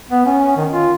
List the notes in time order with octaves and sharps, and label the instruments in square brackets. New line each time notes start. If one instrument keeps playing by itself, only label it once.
[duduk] B3
C#4
D#3
F4